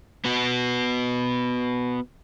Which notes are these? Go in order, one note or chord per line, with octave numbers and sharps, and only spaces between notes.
B3 F#4